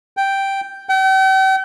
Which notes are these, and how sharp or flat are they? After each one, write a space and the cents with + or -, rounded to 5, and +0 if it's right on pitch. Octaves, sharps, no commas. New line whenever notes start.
G5 -5
G5 -45